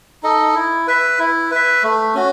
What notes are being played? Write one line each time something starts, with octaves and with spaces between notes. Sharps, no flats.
D#4 A4 D#5
E4
B4 E5
E4
B4 E5
A3
C#4 F#4